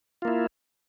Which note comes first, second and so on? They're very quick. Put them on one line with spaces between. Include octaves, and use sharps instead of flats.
F4 A#3 E4